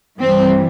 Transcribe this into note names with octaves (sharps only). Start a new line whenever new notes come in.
G2 E3 G3 C4